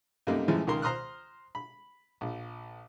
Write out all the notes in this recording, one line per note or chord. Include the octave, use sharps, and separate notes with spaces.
F#2 C3 G3 A3 A#3 D#4
F#2 A2 E3 F3 G#3
C#2 D#3 A#4 C6
C5 A#5 C6 D#6 F6 F#6
B5
A#1